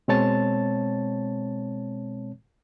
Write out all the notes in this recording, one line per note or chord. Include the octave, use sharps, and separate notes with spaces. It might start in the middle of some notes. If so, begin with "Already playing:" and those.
B2 G#3 C4 C#5 A5 A6